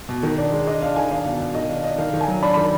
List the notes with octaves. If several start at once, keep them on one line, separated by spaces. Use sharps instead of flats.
B2
D#3
D4
G#3
D4 D#5
D4 F5
D#3 G#5
D4 F5
B2
B2
D#3 D#5
D4 F5
D4 D#5
D#3 F5
D#3
G#5
F#3
D4 B5
D#3 B5